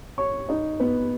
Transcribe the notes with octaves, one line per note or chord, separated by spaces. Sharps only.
C#5 C#6
D#4 D#5
B3 B4